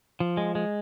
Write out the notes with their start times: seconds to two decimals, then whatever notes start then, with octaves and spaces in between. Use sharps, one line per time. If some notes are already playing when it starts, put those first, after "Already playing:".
0.20 F3
0.37 G#3
0.55 G#3